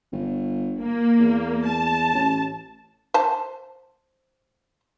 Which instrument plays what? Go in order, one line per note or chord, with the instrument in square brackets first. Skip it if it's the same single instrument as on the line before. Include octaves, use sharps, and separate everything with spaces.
[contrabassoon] G1
[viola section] A#3
[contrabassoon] E2
[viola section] A5
[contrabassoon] A1
[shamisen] C5 A5